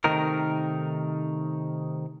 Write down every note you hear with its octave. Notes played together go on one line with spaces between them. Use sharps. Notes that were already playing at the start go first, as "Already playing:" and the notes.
C3 D#3 A3 D#4 A#4